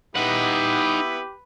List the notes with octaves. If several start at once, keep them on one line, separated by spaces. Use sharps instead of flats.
B3 D#4 E4 G4 B4 F#5